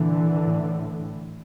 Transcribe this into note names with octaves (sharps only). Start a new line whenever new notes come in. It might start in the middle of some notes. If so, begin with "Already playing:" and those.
Already playing: A#2 D3 E3
A2